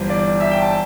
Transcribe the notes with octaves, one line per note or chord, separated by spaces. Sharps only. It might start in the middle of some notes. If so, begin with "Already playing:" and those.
Already playing: G1 G2 E3 C5
D5
E5
G5
A5